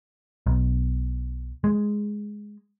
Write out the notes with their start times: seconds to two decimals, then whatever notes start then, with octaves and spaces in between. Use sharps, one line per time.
0.47 B1
1.64 G#3